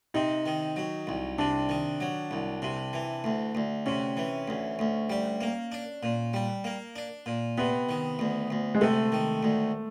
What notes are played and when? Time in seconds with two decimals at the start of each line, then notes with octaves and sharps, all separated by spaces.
0.14 C3 D#4
0.46 D#3
0.76 F#3
1.07 C2
1.38 C3 D4
1.69 D#3
2.00 F#3
2.31 C2
2.62 C3
2.93 E3
3.24 D2
3.55 D2
3.86 C3 C#4
4.17 E3
4.48 D2
4.79 D2
5.10 G3
5.41 A#3
5.72 D4
6.03 A#2
6.34 G3
6.64 A#3
6.96 D4
7.26 A#2
7.58 C3 B3
7.89 D#3
8.19 D2
8.50 D2
8.74 G#3
8.81 C3 A3
9.12 D#3
9.43 D2